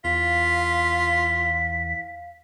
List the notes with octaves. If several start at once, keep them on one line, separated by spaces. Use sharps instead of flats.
E2 F4 F5 B6